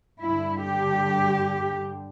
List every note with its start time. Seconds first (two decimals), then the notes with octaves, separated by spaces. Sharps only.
0.23 G2 D3 E4
0.65 G4